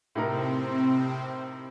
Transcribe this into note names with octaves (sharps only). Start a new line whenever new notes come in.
A2 C3 A3 C4 D#4 G4 A#4